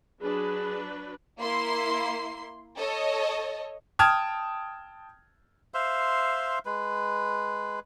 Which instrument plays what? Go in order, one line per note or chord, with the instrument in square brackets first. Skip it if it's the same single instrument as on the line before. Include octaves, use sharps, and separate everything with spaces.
[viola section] F#3 D4 B4 [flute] G#4
[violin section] A#3 E4 C6 C7
A4 C#5 D#5
[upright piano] G5 A5 D#6 F6 G#6
[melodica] C5 E5 F5 C6
G#3 B4